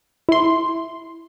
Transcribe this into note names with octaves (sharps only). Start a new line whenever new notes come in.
E4 C6